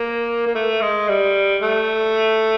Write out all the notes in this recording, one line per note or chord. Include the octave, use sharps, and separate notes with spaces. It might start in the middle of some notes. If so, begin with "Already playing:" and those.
Already playing: A#3
A#3
A3
G#3
G3
A3